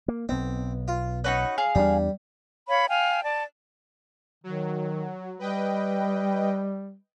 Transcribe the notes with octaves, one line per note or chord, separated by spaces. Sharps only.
A#3
B1 B3 C4
F4
C#4 D#4 F#4 B4
G#4 F5
E2 G3 A3 D4
C#5 F5 B5
F5 G5 G#5
D5 A5
D#3 F#3
G3 B4 D#5 G5